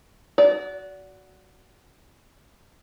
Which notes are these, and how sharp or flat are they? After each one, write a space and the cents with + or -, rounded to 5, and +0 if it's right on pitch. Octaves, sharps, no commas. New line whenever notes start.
F#4 +0 D5 -30